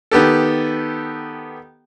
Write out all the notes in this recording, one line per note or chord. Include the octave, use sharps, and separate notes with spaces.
D#3 B3 G4 A4